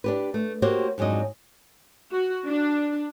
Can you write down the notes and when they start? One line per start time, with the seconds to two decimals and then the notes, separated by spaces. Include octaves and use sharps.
0.04 D4 G4 B4
0.34 A3
0.62 A#3 F#4 G4 C5 C#5
0.98 F2 G#2 F#3 D4 D#5
2.12 F#4
2.47 D4